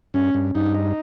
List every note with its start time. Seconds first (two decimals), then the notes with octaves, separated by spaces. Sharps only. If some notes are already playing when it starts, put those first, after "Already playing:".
0.14 G2 C#4
0.34 G2
0.55 G2 D#4
0.75 D#4